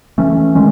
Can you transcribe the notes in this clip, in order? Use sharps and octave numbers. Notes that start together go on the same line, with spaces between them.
E3 A3 C#4
D#3 G#3 C#4